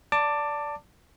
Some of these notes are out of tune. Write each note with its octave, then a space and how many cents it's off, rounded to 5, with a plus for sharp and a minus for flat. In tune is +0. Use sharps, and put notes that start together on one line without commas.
D5 -15 A5 +20 D6 +5